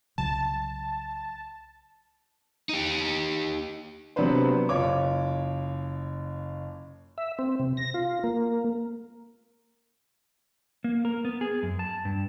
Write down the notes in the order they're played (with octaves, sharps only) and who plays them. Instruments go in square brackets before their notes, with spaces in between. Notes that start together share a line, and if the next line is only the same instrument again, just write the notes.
[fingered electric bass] C2 C#3 F#3 [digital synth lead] A5
[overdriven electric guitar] D#4 G4
[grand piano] C3 F#3 B3 D4 B4 C5
F#1 F4 C#5 D6
[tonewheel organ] E5
C4
C3
A#6
F4
A#3
[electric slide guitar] A#3
A#4
B3
G#4
F#2
A5
G2